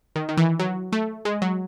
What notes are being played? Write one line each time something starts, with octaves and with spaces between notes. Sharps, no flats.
D#3
D#3
E3
F#3
A3
G#3
F#3